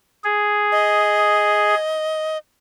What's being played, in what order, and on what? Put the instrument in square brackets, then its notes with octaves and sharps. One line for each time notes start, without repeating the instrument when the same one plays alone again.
[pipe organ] G#4
[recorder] D#5